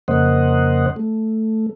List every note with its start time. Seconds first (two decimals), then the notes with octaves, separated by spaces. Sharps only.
0.08 F2 C#3 A#3 C5 D#5 F#5
0.96 A3